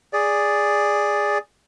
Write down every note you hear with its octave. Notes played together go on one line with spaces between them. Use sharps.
G#4 D5